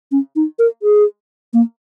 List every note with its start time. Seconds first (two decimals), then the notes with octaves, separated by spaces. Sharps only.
0.12 C#4
0.36 D#4
0.59 A#4
0.82 G#4
1.53 A#3